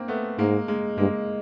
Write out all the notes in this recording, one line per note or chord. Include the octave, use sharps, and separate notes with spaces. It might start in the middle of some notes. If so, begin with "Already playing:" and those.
Already playing: A#3 C4
A3 B3
G#2 G#3 A#3
G#3 A#3
G2 G#3 A#3